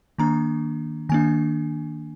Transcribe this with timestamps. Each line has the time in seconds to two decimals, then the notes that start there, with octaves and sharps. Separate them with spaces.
0.18 D#3 A#3 D4 A#5
1.09 D#3 A#3 D4 G#5